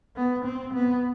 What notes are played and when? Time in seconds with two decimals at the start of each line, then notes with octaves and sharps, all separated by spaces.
0.16 B3
0.45 C4
0.74 B3